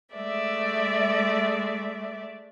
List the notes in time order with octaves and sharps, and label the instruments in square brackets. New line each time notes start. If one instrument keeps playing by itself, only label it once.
[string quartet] G#3 A3 D5 E5